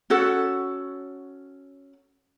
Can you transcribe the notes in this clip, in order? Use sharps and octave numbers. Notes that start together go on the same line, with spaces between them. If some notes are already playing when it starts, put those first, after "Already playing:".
C#4 F#4 A4 F#5